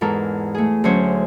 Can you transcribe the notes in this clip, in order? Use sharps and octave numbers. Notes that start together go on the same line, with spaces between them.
E2 G#2 A4 A#4
A3 G#4
D2 D3 F#3 C#4 C5 C#5